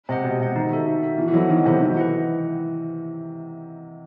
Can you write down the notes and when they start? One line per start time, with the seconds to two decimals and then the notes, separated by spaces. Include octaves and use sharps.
0.09 C3 C5 D#5 F#5
0.24 B2 G4
0.40 C3 C5 D#5 F#5
0.56 D#3 D#4
0.71 F#4 A4 E5
0.87 D#4
1.03 F#4 A4 E5
1.18 E3 B3
1.28 E3
1.33 F#3 E4 A4 C5 D#5
1.50 D#3 B3
1.65 C3 E4 A4 C5 D#5
1.80 D#3 F#4
1.96 E3 B4 D#5 F#5